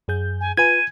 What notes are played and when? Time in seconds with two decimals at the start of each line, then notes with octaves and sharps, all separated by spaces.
0.08 F#2 G#4 G6
0.41 G#5
0.57 F4 B4 G#5 G#6 D#7